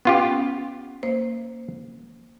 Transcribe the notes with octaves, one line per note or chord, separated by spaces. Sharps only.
B3 C#4 F4 G4
A#3 C5